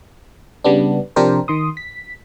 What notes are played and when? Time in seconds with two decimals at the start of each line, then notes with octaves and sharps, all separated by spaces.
0.64 C#3 G3 B3 D4
1.16 C3 F3 D4 G4 A#4 C5
1.48 D#3 C6 D#6
1.77 B6